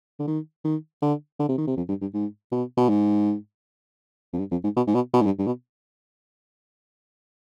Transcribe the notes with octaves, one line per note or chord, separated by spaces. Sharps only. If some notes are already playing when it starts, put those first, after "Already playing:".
D3
D#3
D#3
D3
D3
C3
D#3
C3
F2
G2
G2
G#2
B2
B2
G#2
F2
G2
F2
G#2
B2
G#2
B2
B2
G#2
G2
G2
B2